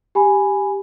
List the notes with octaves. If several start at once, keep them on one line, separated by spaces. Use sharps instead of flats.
G4 G#5 B5